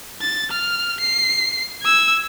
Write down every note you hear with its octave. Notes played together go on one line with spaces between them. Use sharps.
A6
F6
C7
E6 G#6